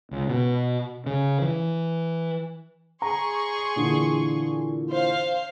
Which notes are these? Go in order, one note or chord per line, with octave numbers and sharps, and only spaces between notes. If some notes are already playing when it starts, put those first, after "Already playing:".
C#2
B2
C#3
E3
G#4 A#5 C6 C#6
A#2 D3 E3
C5 F5